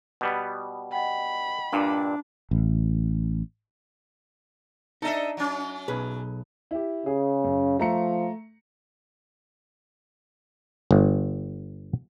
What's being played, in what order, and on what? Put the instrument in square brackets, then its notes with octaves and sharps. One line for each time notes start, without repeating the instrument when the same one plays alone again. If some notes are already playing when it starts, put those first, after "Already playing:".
[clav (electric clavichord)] B2 G3 B3
[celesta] D#5 F#5 G5 [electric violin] B5
[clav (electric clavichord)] G2 A#2 [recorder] D4
[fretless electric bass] A1
[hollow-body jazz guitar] D4 D#4 [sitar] A4 D#5 E5
[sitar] F#3 C#4
[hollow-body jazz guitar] B1 G#4 B4
[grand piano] E4 G4
[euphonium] C#3 [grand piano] G#4
[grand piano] F#2
[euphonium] F3 [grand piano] A3 A#5 C#7
[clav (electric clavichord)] G1